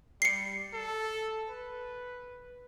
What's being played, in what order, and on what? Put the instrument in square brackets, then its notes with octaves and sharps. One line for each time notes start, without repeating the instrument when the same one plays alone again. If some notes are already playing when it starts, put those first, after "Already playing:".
[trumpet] G3 [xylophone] C7 C#7
[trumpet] A4
B4